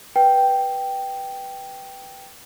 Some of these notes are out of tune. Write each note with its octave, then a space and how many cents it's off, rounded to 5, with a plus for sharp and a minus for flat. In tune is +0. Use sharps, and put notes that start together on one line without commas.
B4 -10 G5 -5